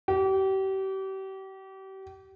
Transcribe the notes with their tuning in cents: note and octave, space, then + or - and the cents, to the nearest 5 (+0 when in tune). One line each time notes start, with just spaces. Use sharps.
G4 -35